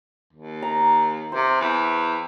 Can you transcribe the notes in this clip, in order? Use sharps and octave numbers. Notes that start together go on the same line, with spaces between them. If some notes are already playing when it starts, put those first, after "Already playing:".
D#2
A#5
C3 C5
E2